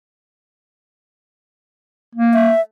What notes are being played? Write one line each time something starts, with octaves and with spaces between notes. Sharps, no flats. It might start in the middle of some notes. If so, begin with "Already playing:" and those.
A#3
E5